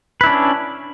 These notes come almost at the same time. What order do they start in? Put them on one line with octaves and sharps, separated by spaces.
B4 E4 D4 C#4